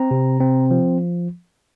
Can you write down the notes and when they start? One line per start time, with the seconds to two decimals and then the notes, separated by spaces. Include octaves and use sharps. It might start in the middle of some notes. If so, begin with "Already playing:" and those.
Already playing: C4 A#5
0.11 C3
0.40 C4
0.71 F3